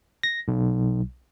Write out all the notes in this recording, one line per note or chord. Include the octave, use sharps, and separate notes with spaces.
A#6
B1